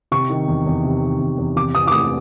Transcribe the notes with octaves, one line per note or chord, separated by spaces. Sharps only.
C3 C#6
D#3
E2
E2
C3
D#3
E2
E2
C3 D6
E3 D#6
D6
A3 D#6